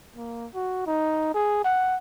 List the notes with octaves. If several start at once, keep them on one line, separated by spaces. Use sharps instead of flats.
A#3
F#4
D#4
G#4
F#5